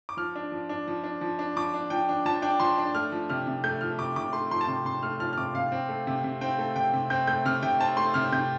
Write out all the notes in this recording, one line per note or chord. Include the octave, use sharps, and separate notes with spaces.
D6
F3 F6
D4
F3
D4
F3
D4
F3
D4
F3 D6
D4
F3 G5
D4
F3 A5
D4 G5
F3 C6
D4
A3 F6
F3
C3 F6
C3
A3 G6
F3 F6
C3 D6
C3 D6
A3 C6
F3 C6
A5
C3 C6
C3 C6
A3 F6
F3 F6
F6
C3 D6
C3 F5
C4
A3
C3
C3
C4 G5
A3
C3 G5
C3
C4 G6
A3 G6
C3 F6
C3 G5
C4 A5
A3 C6
C3 F6
C3 G6